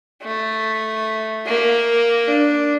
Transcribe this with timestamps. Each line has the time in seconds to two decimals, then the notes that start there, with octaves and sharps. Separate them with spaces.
0.23 A3
1.46 A#3
2.28 D4